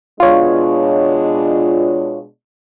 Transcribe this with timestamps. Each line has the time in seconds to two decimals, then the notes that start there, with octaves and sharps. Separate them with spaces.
0.20 B2 G#3 D4 F4 C#5